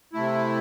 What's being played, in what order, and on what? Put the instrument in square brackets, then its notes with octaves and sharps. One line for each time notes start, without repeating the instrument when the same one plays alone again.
[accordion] C3 A3 E4